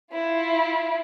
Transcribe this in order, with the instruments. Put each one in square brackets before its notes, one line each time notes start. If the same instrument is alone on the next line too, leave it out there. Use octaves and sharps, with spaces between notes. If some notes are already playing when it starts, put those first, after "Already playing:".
[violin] E4 F4